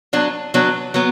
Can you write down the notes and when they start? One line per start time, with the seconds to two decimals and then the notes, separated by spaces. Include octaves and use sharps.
0.13 F#3 B3 D4
0.54 F#3 B3 D4
0.94 F#3 B3